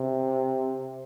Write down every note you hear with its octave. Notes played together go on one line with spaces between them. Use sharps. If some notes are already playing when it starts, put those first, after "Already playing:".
Already playing: C3